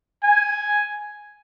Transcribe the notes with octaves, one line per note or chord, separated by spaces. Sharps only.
G#5